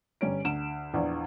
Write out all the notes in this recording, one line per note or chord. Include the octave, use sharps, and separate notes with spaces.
G1 G3 C#4 D7
D2 D7 E7
A#1 E2 D5